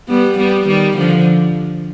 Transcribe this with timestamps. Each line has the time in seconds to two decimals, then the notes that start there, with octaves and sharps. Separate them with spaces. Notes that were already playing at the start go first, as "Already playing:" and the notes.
0.08 G3 B3
0.38 G3 B3
0.67 D#3 G3
0.98 D3 F3